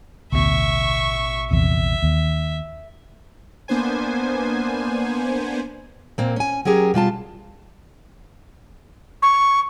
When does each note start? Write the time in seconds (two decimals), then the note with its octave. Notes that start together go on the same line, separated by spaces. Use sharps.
0.32 A1 D2 B2 E5 C#6
1.51 A#1 E2 C3 E5
2.02 D#2
3.68 A#3 B3 D4 C5 G#5
6.18 A#2 A#3 C4
6.36 C#4 G#5
6.65 F#3 C#4 G4 G#4 A#4
6.94 B2 G3 F4 A5
9.22 C#6